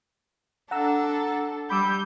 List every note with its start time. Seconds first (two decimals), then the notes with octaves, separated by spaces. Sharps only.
0.71 D4 A4 F#5 A#5 E6
1.70 G3 B5 D6 E6 G6